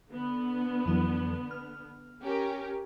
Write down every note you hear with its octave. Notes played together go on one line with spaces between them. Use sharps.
D3 B3
F2 E3 F#3
F6
C#4 G4 A#4